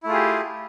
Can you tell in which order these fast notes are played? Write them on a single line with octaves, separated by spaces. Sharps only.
E4 A3 F4 G#4 G4